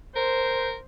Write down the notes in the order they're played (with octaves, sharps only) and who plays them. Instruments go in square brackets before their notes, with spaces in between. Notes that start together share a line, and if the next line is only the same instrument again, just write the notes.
[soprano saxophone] A#4 [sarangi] C5